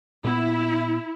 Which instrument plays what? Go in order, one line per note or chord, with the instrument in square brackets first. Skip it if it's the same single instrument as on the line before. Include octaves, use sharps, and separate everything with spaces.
[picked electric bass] A#2 B3 [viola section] E4